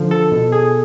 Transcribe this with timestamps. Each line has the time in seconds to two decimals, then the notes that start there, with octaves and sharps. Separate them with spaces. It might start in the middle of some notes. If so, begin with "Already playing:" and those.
Already playing: D3 F3
0.11 A4
0.32 B2
0.52 G#4